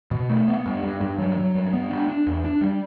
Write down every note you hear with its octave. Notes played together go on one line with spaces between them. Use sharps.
B2
A3
B3
G2
G2
G2
F#3
F#3
G2
B3
D4
D4
E2
D4
G3